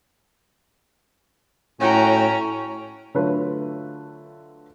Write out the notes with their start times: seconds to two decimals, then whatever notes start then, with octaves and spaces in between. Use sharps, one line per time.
1.81 A2 C#4 F#4 G5 A#5
3.14 D3 F#3 A3 F4 B4